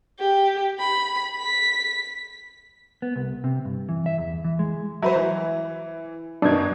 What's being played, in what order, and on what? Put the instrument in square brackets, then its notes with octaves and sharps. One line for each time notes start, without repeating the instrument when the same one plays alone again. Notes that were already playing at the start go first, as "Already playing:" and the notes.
[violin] G4
B5
B6
[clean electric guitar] B3
C2
C3
G2
E3
E5
E2
E3
G#3
[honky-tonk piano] F#3 B4 C5 [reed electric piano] E5
[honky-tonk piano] E3
[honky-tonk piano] F#2 B2 D#3 [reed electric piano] D4 G#6